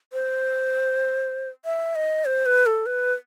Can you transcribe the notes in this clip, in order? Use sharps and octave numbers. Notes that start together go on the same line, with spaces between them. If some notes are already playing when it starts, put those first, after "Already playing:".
C5
E5
D#5
C5
B4
A4
B4